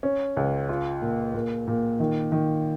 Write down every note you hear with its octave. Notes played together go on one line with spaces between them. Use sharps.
C#4
C#2
F4
A#2
A#2
A#2
D#3
D#3